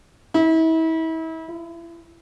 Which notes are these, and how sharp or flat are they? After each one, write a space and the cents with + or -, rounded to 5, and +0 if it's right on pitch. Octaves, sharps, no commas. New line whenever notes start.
E4 -35
E4 +35